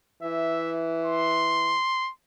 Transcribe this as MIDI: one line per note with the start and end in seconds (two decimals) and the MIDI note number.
0.23 1.77 52
0.23 0.76 76
1.05 2.10 84